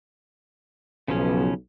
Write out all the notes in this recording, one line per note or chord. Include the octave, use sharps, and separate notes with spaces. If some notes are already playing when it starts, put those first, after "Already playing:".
B1 C#3 F3 C#4